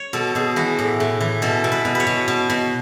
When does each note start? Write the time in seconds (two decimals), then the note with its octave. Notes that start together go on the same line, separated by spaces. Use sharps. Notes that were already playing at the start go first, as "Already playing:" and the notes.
Already playing: C#5
0.13 B2 A4
0.35 B2 G#4
0.56 E3 F#4
0.79 A2
1.00 A2
1.21 E3
1.42 B2 A4
1.64 B2
1.72 B4
1.85 B2
1.95 B4 C#5
2.07 B2
2.28 B2
2.50 B2